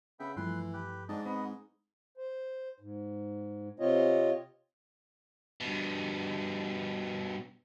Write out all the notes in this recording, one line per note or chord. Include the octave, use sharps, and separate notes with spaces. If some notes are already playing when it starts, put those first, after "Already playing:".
C#3 B3 E5 G5
G2 E3 F3 A3 B4 C6
G4 B4
G#2 D4 D#5 A5
B3 C4 D#5
C5
G#2
C3 C4 F4 C#5 D#5
G2 B2